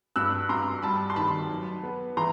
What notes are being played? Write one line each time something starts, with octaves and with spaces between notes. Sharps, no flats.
G2 E6 F#6
G2 A#5 C6
G3 A5 B5
C6
D#3 A5 B5
F#3
B3
E3 A#5 C6